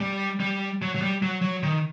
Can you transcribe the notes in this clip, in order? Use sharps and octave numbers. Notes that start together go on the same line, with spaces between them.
G3
G3
F#3
F#3
G3
F#3
F#3
D#3